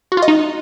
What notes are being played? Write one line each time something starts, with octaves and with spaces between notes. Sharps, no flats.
F#4
F4
D#5
D#4